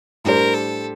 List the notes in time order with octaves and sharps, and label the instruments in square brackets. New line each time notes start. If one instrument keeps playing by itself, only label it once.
[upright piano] A2 G3 D4 G4 C5 [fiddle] A#4
[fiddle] A4